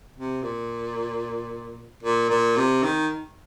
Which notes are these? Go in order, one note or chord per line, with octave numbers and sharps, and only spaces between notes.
C3
A#2
A#2
A#2
C3
D#3